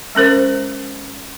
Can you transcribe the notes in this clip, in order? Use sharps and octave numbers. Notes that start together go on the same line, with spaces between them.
G#3 C#4 A#4 C5